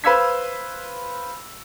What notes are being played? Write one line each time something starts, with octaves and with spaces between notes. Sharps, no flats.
B4 C5 F5 E6 G#6 B6